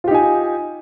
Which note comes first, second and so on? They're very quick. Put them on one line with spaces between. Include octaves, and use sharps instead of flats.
F4 G4 D#4 G#5